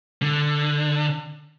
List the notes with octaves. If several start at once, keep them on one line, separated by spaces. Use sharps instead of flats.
D3